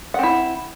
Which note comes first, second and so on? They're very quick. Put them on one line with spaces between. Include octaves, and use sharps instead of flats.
F#5 C4 E4